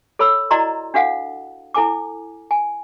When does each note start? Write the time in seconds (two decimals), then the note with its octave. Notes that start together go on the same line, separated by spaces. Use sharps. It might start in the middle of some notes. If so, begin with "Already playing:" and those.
0.19 A4 C#5 B5 E6
0.51 E4 F#4 D5 D#5 A#5 C6
0.94 D4 F#4 A4 F5 F#5
1.74 E4 A4 G#5 D6
2.51 G#5